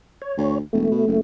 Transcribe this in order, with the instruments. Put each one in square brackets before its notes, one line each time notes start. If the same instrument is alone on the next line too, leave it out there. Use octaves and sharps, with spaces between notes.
[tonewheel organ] C#5
[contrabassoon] D2
[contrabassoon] E1 [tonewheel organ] A3
[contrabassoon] B2
F#1